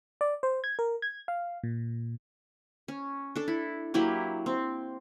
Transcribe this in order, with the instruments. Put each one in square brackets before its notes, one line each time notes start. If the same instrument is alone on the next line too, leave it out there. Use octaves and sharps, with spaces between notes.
[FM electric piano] D5
C5
G#6
A#4
G#6
F5
A#2
[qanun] C#4
D4 A4
E4
F#3 A#3 E4 G4
C4